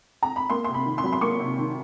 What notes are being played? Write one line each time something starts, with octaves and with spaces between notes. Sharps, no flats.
A#5
B5
A#3 C6
C3 C6
B5
D#3
C6
F#3 B5
C6
A#3 C#6
C3
D#3